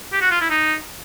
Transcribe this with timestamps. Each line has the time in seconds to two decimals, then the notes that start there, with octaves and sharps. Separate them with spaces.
0.13 G4
0.21 F#4
0.31 F4
0.41 E4
0.50 D#4